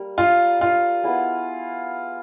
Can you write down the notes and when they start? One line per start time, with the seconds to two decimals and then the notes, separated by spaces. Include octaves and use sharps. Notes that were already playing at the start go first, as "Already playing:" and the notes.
Already playing: G3 A#3
0.18 F4
0.61 F4
1.03 B3 E4 G#4